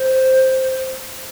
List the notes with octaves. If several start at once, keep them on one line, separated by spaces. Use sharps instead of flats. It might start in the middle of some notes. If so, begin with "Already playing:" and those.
Already playing: C5